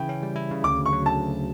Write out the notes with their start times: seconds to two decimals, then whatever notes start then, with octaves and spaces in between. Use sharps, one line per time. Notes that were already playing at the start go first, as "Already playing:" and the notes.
Already playing: C#3 E3 E4 G5
0.09 C#4
0.23 G3
0.36 E4
0.51 C#3
0.64 D2 D6
0.78 D2
0.86 C#6
0.93 F#3
1.06 D3 A5
1.19 D2